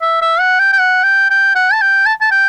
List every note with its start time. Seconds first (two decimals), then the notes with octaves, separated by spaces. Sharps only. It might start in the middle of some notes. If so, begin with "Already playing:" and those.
0.01 E5
0.21 E5
0.40 F#5
0.59 G5
0.72 G5
0.79 F#5
1.03 G5
1.30 G5
1.55 F#5
1.72 A5
1.81 G5
2.06 A5
2.21 A5
2.31 G5